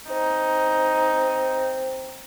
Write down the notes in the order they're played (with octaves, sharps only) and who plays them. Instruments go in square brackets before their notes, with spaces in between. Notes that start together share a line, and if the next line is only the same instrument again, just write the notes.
[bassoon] C4 [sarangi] D#4